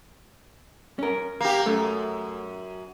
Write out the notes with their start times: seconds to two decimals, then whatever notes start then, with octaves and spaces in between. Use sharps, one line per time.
0.99 C#4 A#4
1.41 A#3 G4
1.66 F#2 A3